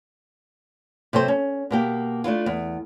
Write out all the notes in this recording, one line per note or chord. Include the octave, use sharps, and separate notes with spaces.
C3 F#3 A4 C5
C#4
B2 A#3 G4
A3 D4 E4 F4
E2